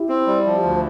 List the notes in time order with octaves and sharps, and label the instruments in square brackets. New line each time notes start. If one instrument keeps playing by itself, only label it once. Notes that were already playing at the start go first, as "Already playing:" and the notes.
Already playing: [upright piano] E4 G4
[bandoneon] C4
G3
F3
D2